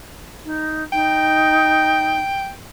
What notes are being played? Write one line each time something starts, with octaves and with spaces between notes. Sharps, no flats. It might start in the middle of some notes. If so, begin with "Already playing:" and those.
D#4
D#4 G5